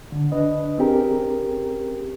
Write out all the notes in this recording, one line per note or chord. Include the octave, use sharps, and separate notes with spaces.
D3
D4 B4 D#5
C4 C#4 G4 G#4 A#4